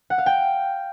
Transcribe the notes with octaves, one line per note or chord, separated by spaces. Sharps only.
F#5
F5
G5